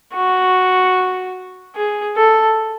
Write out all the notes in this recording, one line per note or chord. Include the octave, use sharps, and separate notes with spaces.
F#4
G#4
A4